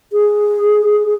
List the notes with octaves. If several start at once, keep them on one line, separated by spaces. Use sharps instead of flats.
G#4